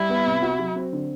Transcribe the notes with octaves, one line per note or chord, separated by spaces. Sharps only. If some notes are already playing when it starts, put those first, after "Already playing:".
Already playing: G3 E4
B3
C3
F#4
F#3
C4
D3